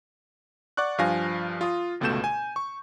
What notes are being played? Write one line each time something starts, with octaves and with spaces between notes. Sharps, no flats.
D5 F#5 C#6 F#6
G2 F3 F5 G#5 A#6
F4 D#6
G1 C#2 B2 A3 G6 E7
G#5
C#6